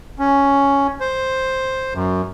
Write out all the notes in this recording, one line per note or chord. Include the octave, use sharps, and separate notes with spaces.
C#4
C5
F#2